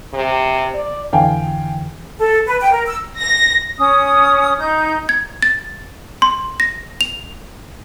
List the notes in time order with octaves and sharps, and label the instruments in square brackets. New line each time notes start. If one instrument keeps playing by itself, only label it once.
[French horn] C3
D5
[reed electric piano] F2 D3 E3 [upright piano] F5 G5 G#5
[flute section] A4
B4
G5
A#4
E6
[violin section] A#6
[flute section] C#4 D#6
D#4 G6
[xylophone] G#6
A6
C6
A#6
F7